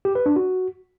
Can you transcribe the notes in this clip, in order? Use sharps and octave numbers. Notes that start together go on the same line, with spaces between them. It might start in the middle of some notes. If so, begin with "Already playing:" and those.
G4
B4
D4
F#4